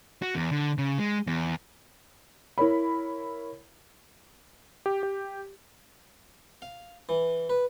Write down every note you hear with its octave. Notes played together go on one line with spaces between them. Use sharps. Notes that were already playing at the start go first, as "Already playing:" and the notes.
F#4
E2
D3
C#3
G#3
E2
E4 A#4 C#5 B5
G4
G4
F5
E3
B4